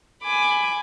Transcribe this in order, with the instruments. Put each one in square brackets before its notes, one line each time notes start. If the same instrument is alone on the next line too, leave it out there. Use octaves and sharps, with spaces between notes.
[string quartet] G#5 B5 D6